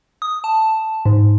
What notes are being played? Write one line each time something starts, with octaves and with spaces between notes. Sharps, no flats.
D#6
A5
G#2